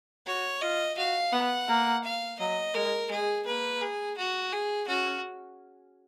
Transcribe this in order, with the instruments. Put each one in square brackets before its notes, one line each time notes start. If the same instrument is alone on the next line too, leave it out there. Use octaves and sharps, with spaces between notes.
[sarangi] F#4 [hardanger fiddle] C#5
[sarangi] F4 [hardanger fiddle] D#5
[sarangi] F#4 [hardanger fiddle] F5
[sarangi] B3 [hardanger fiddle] F#5
[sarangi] A#3
[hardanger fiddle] F5
[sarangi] F#3 [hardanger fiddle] D#5
[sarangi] G#3 [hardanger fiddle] A#4
[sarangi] G#3 [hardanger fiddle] G#4
[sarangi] A#3 [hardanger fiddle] B4
[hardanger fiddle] G#4
F#4
G#4
[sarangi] C#4 [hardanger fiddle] F#4